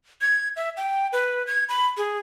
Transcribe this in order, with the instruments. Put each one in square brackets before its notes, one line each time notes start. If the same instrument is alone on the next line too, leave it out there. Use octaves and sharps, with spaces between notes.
[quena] G#6
E5
G5
B4
G#6
B5
G#4